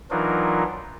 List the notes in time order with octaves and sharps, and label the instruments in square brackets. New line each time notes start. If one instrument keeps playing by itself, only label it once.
[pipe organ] E3 F#3 D4 D#4 F4 A#4